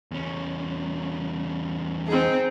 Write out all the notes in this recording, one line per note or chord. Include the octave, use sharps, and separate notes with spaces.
E2 C#4
C4 D#4 G#4